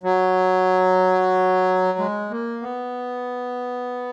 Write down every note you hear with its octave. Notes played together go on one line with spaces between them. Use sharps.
F#3
G#3
A#3
B3